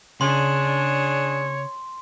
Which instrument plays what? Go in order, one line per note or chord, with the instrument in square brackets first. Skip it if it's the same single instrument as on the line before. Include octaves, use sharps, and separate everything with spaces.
[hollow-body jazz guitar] C#3 [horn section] D4 G#4 [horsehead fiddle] C#5 [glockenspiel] C6